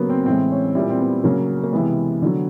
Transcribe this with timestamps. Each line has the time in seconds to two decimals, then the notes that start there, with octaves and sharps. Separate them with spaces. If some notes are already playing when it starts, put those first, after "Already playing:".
Already playing: C#3 F#3 A#3 B3
0.09 C4
0.26 A2 E3 G#3 C4
0.51 C#4
0.75 A#2 G3 E4
0.90 C4
1.00 B3
1.24 C#3 F#3 A#3
1.63 A#3
1.73 C3 E3 G#3 B3
2.22 D3 F#3